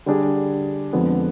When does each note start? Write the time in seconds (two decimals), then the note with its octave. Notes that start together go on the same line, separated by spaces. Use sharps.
0.06 D3 G3 D4 G#4
0.93 F2 D3 F3 G#3 B3